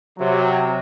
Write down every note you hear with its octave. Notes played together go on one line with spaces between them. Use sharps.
C3 F#3